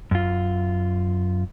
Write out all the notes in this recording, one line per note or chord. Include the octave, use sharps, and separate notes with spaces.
F#2 F4